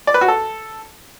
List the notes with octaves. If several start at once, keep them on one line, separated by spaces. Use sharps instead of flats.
D5
B4
F#4
A4